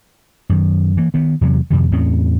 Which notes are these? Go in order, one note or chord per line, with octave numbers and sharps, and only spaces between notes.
F#2 D#3
E3 A#3
D#3 B3
E2 C3 F#3
F2 A2 C3 D#3
E2 A2 C4 C#4